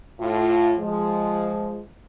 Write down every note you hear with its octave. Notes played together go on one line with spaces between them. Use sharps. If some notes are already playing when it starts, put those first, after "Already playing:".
A2 F4
F3 G#3